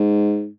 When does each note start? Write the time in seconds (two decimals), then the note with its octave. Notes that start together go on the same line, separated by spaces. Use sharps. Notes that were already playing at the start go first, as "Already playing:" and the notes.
Already playing: G#2